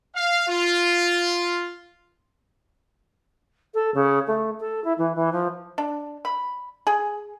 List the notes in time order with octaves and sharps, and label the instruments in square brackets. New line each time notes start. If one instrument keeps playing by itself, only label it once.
[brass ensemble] F5
F4
[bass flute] A4
C#3
A3
A4
E4
E3
E3
F3
[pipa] D4
B5
G#4